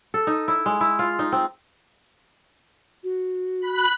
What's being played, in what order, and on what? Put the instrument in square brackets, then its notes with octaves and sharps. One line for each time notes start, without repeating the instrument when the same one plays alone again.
[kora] A4
D#4
E4
G#3
E4
F4
D#4
C4
[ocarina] F#4
[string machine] B5 F#6 B6